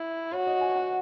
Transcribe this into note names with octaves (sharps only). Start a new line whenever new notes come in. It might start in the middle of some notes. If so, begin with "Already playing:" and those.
Already playing: E4 E5
F#4 C#5
D#5
G#5
F#5